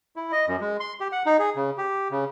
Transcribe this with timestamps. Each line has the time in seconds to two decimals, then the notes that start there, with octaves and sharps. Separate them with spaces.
0.16 E4
0.32 D#5
0.48 F#2
0.60 G#3
0.80 C6
1.00 G4
1.12 F#5
1.26 D#4
1.39 G#4
1.56 C#3
1.78 G4
2.11 C#3